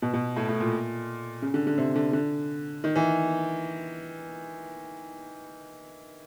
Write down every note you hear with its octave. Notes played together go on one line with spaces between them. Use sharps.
B2
B2
A2
A2
A#2
C#3
D3
D3
C3
D3
D3
D#3
E3